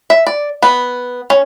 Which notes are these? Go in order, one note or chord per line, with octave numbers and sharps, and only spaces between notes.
E5
D5
B3
C#4